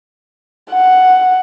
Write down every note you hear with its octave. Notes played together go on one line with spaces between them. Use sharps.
F#5